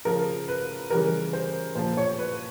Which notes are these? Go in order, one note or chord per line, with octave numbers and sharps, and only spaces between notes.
C#3 F3 A#4
B4
C#3 E3 G3 A#4
C5
A#2 F3 C5
C#5
B4